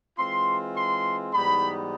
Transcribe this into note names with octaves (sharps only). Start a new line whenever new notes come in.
E3 G#3 C4 F4 C6
C6
G#2 E3 G3 B3 D#4 B5